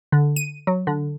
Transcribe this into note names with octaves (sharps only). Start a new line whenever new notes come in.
D3
D#7
F#3
D3